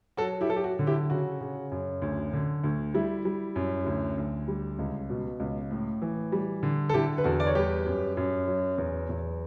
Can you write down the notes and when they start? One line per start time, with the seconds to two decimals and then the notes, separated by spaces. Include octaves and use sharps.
0.17 F#3 F#4 A4
0.41 E4 G4
0.49 F#3 A4
0.56 G4
0.64 F#4
0.79 D3
0.87 E4 G4
1.10 C#3 F#4
1.41 C#3
1.72 F#2
2.02 D2
2.33 D3
2.64 D2
2.94 G3 E4
3.25 G3
3.56 F#2
3.86 D2
4.18 D2
4.48 G3
4.79 C#2
5.10 B2
5.40 C#2
5.71 A2
6.02 E3
6.32 G3
6.63 D3
6.89 A4
6.94 D3 E4 G4
7.18 B4
7.24 E2 F#4 A4
7.40 D5
7.47 C#5
7.55 G3 G4 B4
7.86 F#2
8.17 F#2
8.48 F#3
8.78 E2
9.09 E2